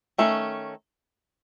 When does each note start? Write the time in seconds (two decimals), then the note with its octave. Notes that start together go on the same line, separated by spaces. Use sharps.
0.18 D#3 A3 C#4